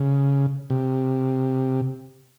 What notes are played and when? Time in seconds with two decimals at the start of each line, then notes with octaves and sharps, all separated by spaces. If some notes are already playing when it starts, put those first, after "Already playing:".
Already playing: C#3
0.70 C3